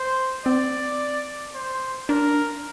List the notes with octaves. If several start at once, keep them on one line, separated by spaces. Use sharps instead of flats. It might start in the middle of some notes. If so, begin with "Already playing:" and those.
Already playing: C5
C4 D5
C5
D4 A#4